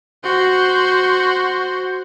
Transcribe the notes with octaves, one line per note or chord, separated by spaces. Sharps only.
F#4 C5